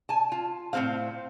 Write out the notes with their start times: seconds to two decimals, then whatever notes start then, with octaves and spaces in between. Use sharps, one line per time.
0.09 G#5 A5
0.32 F4
0.73 A2 A#3 C4 C5 F5